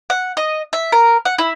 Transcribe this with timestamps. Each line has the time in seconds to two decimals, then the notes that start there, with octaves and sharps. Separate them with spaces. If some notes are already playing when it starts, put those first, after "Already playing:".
0.10 F#5
0.37 D#5
0.73 E5
0.92 A#4
1.25 F#5
1.38 E4